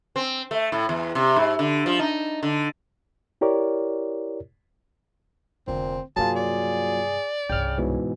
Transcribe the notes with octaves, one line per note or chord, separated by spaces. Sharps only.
C4
A3
A2
E2
C3
G#2
D3
F3
D#4
D3
E4 G4 A#4 C#5 D5
F1 A#2 D3 C4
G2 C3 F#3 A#3 F4 G#4 A5
D5
C2 G2 C#3 G5 F6
G#2 B2 E3